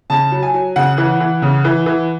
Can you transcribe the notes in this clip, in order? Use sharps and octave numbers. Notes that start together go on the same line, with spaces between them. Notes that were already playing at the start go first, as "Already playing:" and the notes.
C#3 A5
F#3
G#5
F#3
C#3 F#5
E3
E3
C#3
E3
E3